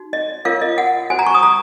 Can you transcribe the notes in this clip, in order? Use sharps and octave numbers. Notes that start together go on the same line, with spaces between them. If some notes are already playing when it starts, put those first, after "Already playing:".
Already playing: D#4 F#4
D#5
F4 A#4 C#5 F5
D#5
F#5
F#4 C5 G#5
A#5
C#6
D#6
A#5